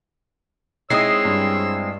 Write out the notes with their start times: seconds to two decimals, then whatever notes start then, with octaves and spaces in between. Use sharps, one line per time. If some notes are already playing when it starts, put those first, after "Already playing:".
0.90 G#3 C4 D#4 E4 C#5 D#6 E6 C7
1.25 G2